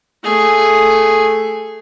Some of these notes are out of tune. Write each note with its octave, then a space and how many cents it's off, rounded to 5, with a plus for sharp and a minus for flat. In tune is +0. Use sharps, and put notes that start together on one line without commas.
A3 +0 G#4 +0